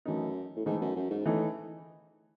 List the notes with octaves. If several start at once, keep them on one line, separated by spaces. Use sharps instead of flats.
F#2 E3 A3 D#4
A2
G#2 E3 A3 D#4
F#2
F#2
G#2
A2 E3 A3 D#4